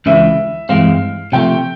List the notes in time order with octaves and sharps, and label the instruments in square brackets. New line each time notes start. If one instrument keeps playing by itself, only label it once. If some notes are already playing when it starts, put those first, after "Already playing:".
[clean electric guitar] C#2 C#3 E3 [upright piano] E5
[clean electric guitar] G2 E3 G#3 C4 [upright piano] F5
[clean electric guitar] C3 F3 A3 [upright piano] G5